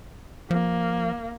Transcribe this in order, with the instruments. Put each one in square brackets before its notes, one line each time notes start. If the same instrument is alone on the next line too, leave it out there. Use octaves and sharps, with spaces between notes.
[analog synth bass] F3 [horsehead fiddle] A#3